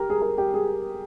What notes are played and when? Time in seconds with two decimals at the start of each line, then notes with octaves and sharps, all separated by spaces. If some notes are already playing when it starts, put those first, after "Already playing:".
Already playing: G4 A#4
0.10 G#4
0.21 A#4
0.38 G4
0.54 G#4